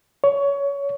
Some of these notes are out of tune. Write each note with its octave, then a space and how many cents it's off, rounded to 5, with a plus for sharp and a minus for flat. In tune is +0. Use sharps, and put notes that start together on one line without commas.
C#5 +20